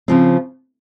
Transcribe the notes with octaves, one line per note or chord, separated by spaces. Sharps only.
C#3 F3 C4